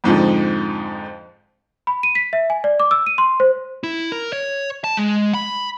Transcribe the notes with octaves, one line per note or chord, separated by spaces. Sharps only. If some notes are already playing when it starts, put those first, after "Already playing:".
F2 G#2 D3 F3
B5
D#7
B6
E5
G#5
D5
D6
E6
D#7
C6
C5
E4
A#4
C#5
A5
G#3
B5